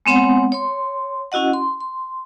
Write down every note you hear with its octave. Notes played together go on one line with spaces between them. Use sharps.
G#3 B3 C4 C#5 F#5
C#5 C6
C#4 E4 F#4 D#5 F#5
C6
C6